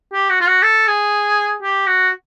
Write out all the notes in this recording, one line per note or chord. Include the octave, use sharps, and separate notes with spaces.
G4
F#4
F4
F#4
A4
G#4
G4
F#4